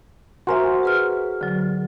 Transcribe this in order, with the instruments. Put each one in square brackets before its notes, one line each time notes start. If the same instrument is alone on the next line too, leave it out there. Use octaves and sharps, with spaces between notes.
[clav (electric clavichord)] F#4 A#4 C5 [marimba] E5 G#5 C6
[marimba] G#4 B4 F6
D3 F#3